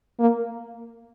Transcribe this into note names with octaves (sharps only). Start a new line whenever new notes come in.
A#3